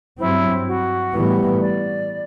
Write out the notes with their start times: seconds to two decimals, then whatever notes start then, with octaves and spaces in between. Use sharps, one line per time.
0.18 G2 F#3 C4 E4
0.67 F#4
1.14 A2 E3 G3 B3
1.61 D5